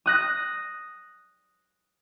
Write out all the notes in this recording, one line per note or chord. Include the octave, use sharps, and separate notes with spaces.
D#6 F#6 A#6